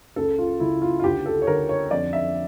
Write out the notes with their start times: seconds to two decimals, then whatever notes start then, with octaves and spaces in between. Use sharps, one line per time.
0.16 C#2 A4
0.38 F4
0.60 C#3 E4
0.82 F4
0.99 F4
1.04 D2 G4
1.26 A4
1.42 C#5
1.47 D3 A#4
1.69 C#5
1.91 F2 D5
2.13 E5